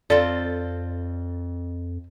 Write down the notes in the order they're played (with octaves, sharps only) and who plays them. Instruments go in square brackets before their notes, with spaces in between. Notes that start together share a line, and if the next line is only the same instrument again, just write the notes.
[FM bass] F2 [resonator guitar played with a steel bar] C4 F4 A4 [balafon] D5